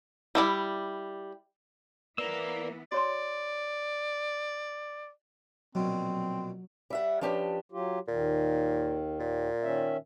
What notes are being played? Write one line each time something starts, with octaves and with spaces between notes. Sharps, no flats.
G3 E4 D5
E3 A#3 B3 E4 B4 D5 A#5 E6
F#4 C#5 D5 C6
A#1 B2 F#3 C4
G3 E5 F#5
F3 C#4 D4 G4 B4
F#3 F4 G4
D#2 A#2 D#3
A#2
D#3 C#4 E5